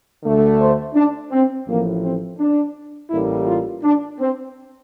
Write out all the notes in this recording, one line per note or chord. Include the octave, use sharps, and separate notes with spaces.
D2 D3 A3
C5
D4
C4
A1 A2 F3 A#3
C4
D4
A1 A2 G3 A#3 E4
F4
D4
C4